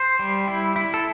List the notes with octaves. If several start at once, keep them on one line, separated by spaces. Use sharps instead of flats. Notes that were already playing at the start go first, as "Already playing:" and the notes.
Already playing: C5
G3
E4
E4
A4